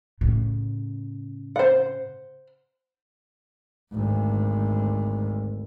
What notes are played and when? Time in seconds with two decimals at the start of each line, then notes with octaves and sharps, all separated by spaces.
0.21 A2 C#3
1.56 C5 F#5
3.92 G#1 D2